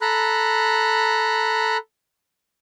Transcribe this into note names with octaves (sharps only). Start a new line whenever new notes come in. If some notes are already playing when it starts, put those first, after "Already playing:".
A4 A#5 B5 F#6